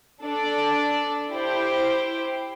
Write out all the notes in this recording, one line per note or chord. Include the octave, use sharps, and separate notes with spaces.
D4 A4 D5
E4 G4 C5 G5